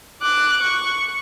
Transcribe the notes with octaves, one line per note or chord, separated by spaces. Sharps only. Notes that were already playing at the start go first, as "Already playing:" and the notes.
D6 F#6
C#6